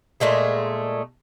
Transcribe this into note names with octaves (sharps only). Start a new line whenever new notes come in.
A#2 G#3 A3 G#4